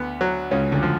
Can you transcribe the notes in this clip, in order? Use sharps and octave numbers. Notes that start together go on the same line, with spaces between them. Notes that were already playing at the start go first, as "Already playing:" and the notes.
Already playing: D2 D3 B3
F#3
C#2 C#3 C#4
D2 D3
F3